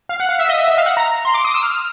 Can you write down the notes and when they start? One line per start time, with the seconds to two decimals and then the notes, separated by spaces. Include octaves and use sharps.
0.09 F5
0.20 F#5
0.29 F5
0.39 E5
0.49 D#5
0.58 E5
0.68 E5
0.78 F5
0.86 F#5
0.97 A#5
1.25 C6
1.34 D6
1.45 D#6
1.54 E6
1.63 F6